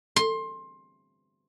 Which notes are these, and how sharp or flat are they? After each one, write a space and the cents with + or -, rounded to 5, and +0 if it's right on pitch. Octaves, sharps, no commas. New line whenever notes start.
C6 +20